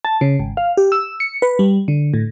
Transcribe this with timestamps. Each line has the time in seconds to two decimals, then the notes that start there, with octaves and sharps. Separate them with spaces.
0.05 A5
0.21 C#3
0.39 G#1
0.57 F5
0.77 G4
0.92 E6
1.20 C#7
1.42 B4
1.59 G3
1.88 D3
2.14 A2